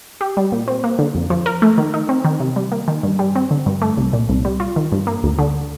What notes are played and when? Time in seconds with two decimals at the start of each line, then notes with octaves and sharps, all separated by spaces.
0.21 G4
0.37 G3
0.52 A#2
0.68 C4
0.84 A#3
0.99 D3
1.15 F2
1.30 F3
1.46 A#4
1.62 A3
1.78 D#3
1.94 D#4
2.09 C4
2.25 D#3
2.40 C3
2.56 G3
2.72 A#3
2.88 D#3
3.03 G2
3.19 G3
3.35 C4
3.51 D3
3.66 G2
3.82 A3
3.97 C2
4.13 A#2
4.29 C2
4.45 G3
4.60 F4
4.76 D#3
4.92 G2
5.07 A#3
5.23 D2
5.39 D3